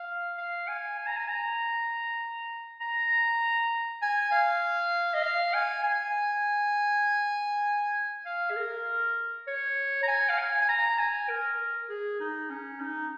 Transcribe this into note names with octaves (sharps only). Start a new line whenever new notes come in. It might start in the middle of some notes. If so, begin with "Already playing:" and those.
Already playing: F5
F5
G#5
G#5
A#5
G#5
A#5
A#5
G#5
F5
D#5
F5
G#5
G#5
F5
G#4
A#4
C#5
A#5
G#5
F5
G#5
G#5
A#5
G#5
A#4
G#4
D#4
C#4
D#4